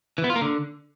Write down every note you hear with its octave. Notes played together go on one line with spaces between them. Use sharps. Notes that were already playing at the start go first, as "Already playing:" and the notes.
E3
B3
F4
A#3
D3